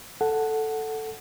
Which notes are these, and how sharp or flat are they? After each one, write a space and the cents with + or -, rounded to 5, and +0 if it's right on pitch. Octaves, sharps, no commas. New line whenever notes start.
A4 +0 F#5 +0